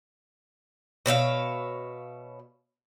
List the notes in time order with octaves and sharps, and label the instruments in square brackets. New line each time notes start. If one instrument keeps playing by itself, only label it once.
[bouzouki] B2 C#5 E5 F5